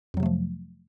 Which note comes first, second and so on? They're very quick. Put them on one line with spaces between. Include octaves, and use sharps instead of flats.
F2 F#3 C3 A3 F3